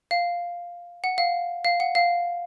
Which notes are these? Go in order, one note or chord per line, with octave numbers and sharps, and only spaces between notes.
F5
F#5
F5
F5
F#5
F5